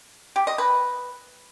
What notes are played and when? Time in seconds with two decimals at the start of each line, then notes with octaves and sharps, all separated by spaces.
0.36 G4
0.47 D#5
0.58 B4